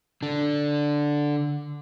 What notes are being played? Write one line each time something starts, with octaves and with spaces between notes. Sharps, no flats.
D3 D4